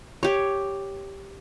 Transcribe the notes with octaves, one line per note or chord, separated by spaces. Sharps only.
G4 C#5